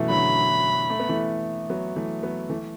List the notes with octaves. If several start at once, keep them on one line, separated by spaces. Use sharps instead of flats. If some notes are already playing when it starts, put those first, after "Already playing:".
Already playing: F#2 B2 E3 A3
D3 F#3 B5
A3
B3
E3 A3
F#3 B3
E3 A3
F#3 B3
E3 A3